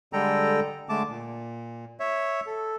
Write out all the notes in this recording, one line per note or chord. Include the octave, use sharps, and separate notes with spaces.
D3 G3 G#3 A4 G5 A#5
D3 G#3 A3 A5 D6
A#2
C#5 E5
A4